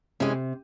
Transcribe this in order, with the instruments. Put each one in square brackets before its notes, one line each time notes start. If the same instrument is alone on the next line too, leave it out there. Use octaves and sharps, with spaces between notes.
[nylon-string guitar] C3 [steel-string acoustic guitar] E3 G#3 C#4